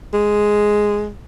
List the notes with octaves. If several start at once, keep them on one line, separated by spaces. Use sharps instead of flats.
G#3